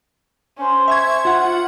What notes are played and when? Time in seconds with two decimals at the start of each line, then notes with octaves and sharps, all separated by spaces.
0.58 C#4 C5
0.88 C5 E5 C#6 G#6
1.25 F4 F#5